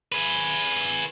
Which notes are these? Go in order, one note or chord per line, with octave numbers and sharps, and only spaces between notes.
G#4 B4